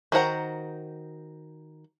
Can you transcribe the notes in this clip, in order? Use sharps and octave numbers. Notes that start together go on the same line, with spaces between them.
D#3 F#4 C5 F#5 A#5